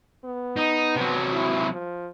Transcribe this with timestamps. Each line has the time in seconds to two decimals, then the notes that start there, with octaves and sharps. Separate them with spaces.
0.25 B3
0.56 D#4
0.96 C3 F#3
1.33 E4
1.73 F3